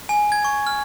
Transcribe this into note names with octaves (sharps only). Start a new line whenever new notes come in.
G#5
G#6
C#6
F6